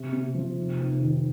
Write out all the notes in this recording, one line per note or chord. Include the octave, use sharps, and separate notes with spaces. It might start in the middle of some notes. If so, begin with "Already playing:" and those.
Already playing: C3
C3
F3
F1
F1
D#3